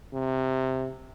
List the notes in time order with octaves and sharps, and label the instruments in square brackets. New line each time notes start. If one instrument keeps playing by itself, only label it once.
[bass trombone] C3